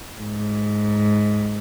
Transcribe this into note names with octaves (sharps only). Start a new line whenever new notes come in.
G#2